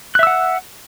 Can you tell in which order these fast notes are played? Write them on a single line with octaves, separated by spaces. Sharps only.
F#6 E5 E6 F#5